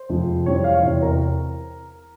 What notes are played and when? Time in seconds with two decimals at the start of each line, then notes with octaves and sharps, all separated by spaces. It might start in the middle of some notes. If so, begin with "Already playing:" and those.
Already playing: C5
0.09 F2 C3 F3 G#3
0.46 F2 E3 G3 C4 C#5
0.64 F5
0.73 C#5
0.83 E2 C3 E3
1.02 A#4